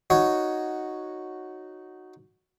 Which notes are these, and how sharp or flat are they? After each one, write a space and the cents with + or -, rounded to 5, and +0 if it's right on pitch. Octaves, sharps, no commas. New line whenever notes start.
D#4 +0 F#4 +0 C#5 +0